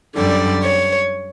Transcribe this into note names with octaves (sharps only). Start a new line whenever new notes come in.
F#2 D3 G3 D5
C#5